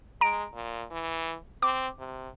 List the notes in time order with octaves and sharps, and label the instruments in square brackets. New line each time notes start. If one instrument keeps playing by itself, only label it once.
[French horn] G#3 [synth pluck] A#5 D7
[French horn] A#2
E3
[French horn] C4 [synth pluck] D6
[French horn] C3